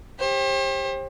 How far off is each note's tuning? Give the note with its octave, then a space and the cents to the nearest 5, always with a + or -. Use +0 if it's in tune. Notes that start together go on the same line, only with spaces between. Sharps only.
G4 +20 C5 +40